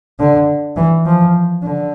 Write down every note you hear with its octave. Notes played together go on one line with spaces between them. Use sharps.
D3
E3
F3
D3